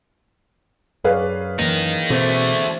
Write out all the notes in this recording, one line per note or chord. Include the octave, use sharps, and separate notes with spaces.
F#2 G#4 B4 C#5 D5 F5
E3 A#3 D#4 A#4
B2 D3 A3 C4 F#4 A4 C5